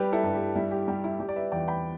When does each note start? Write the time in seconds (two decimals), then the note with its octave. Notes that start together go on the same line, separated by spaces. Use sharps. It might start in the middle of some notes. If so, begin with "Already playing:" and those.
Already playing: G3 G4 B4
0.13 E4 A4
0.23 G2
0.34 G4
0.56 G3 E4
0.71 G4
0.88 G3 G4
1.04 E4
1.20 G3 G4
1.29 D5
1.36 B4 E5
1.52 E2 D5 G5
1.68 G5 B5